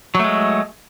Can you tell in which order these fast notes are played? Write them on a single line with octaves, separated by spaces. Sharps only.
F#3 A3 G#3